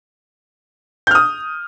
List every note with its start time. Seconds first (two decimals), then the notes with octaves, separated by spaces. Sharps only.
1.07 G6
1.11 F6
1.15 D#6